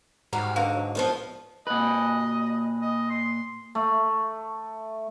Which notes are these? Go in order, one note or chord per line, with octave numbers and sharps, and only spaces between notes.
G#2 G3 F#4 F5 A#5
F#2 D3 D4 B4 F5
F#3
C2 F3 B3 F4
A#2 B4 D#5
D#5
C6
A3